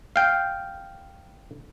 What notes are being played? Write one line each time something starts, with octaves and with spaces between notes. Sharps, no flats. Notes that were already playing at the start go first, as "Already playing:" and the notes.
F5 G5